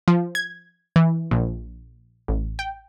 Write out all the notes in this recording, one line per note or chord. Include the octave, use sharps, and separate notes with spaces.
F3
G#6
E3
A#1
A1
G5